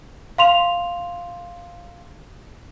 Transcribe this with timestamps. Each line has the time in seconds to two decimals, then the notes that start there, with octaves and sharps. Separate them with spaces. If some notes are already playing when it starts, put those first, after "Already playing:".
0.38 F5 C6 F7